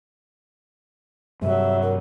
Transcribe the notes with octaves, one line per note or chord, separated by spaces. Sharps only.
G2 C3 F#3 G3 E5
A#4